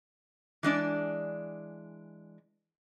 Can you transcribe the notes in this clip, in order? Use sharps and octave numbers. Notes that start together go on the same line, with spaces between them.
E3 G#3 D4 D5